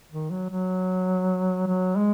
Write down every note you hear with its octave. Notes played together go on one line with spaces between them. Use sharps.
D#3
F#3
F#3
F#3
G#3